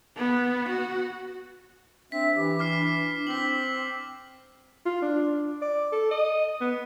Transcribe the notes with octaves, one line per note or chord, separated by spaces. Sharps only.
B3
F#4
C4 D4 E5 B6
E3 G4
E4 D6 F6 C7
C4 B6 F#7
F4
D4
D5
A4
D#5
B3